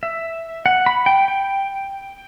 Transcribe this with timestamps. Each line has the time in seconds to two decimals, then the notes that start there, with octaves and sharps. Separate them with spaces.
0.03 E5
0.66 F#5
0.86 B5
1.06 G5
1.28 G5